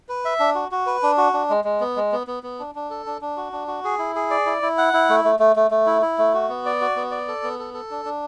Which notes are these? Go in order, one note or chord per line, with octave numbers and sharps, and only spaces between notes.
B4
E5
D4
F#4
F#4
B4
D4
F#4
D4
G#3
G#3
B3
G#3
B3
B3
B3
D4
D4
A4
D4
D4
F#4
D4
F#4
G#4
E4
G#4
D5
E4
E4
F#5
E4
A3
A3
A3
A3
A3
E4
E4
A3
F#4
B3
D5
F#4
B3
D5
A4
B3
A4
A4
D4
D4